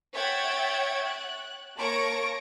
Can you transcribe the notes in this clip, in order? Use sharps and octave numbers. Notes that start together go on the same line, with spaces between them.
C#5 E5 F#5 G5 G#6 A6
F#6
A#3 C#5 A5 C#6 A#6 D7